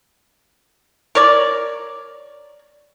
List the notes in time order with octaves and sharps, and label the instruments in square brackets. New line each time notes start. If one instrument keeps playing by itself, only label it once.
[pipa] A#4 C#5 D5